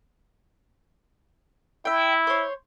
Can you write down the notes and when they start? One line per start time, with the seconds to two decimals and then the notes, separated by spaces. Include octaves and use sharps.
1.85 E4 E5 G5
2.27 C5 C#5